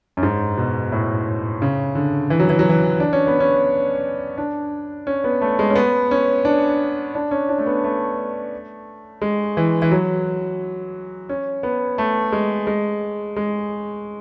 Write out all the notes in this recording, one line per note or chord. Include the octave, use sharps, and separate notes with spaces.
F#2
G#2
B2
A2
C#3
D3
E3
F#3
E3
F#3
E3
D4
C#4
B3
C#4
D4
C#4
B3
A3
G#3
C#4
B3
C#4
D4
D4
C#4
D4
A3
B3
A3
G#3
E3
E3
F#3
C#4
B3
A3
G#3
G#3
G#3